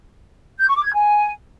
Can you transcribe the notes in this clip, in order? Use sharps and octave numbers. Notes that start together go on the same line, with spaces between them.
G6
C#6
D6
G#6
G#5